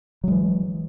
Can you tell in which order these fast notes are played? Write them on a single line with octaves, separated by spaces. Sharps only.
F#3 G#3 E3